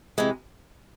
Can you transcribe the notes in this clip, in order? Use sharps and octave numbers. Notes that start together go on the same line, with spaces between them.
C3 E3 G#3